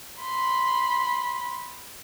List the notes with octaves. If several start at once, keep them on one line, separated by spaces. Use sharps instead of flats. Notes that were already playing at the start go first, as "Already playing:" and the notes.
B5 C6